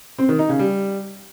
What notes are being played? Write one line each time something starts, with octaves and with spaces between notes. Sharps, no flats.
C4
D#3
D#4
C#3
G3